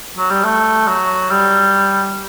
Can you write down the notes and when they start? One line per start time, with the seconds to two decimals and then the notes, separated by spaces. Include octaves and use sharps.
0.17 F#3
0.30 G3
0.44 A3
0.87 F#3
1.31 G3